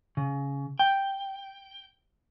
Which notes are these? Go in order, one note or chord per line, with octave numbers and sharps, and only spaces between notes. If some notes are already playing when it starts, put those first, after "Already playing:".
C#3
G5